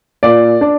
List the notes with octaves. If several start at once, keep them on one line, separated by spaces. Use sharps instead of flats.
A#2 D5
D4